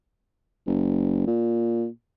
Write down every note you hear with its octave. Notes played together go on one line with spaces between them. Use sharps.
F#1
A#2